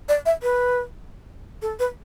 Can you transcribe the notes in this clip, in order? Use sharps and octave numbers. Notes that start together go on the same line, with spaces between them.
D5
E5
B4
A4
B4